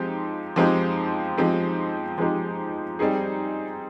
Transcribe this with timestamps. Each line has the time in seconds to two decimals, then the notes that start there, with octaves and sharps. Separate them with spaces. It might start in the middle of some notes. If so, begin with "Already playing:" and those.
Already playing: F3 G#3 C4 D#4 G4
0.56 F3 G#3 C4 D#4 G4
1.38 F3 G#3 C4 D#4 G4
2.18 F3 G#3 C4 D#4 G4
2.99 G3 C4 D#4 G#4